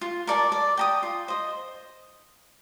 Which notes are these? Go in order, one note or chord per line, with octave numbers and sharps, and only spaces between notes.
F4
A#4 D5 A5
D5
G5 A#5 D#6
F4
C5 D#5